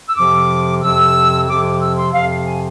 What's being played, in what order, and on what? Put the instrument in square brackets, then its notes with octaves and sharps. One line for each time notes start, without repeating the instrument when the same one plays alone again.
[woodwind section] E6
F2 C3 F3 D6
F2 C3 F3 E6
F2 C3 F3 D6
D6
E6
C6
F2 C3 F3 F5
F5
G#5